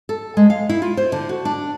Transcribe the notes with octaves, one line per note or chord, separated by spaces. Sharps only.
A4
G#3
F5
E4
F4
C5
D3
F#4
D4